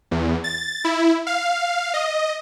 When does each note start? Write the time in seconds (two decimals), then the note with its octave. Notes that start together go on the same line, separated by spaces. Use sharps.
0.11 E2
0.44 A6
0.84 E4
1.27 F5
1.94 D#5